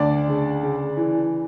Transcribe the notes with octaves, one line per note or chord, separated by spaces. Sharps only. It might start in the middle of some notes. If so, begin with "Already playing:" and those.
Already playing: D2 D4 D5
C#3
C#3
E3